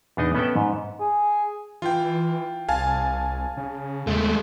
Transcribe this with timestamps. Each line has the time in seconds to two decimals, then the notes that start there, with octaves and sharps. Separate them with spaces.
0.17 E2 D4 D#4 D#5
0.35 B3 C#4 A4 B4 E5 G5
0.56 G#2
1.00 G#4
1.82 E3 F4 G5
2.69 C2 F5 G#5 A5
3.57 C#3
4.07 D#2 G#3 A3